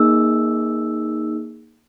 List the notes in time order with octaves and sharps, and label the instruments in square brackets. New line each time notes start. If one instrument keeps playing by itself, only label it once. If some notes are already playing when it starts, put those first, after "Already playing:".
Already playing: [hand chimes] A#3 D#4 G#4 E6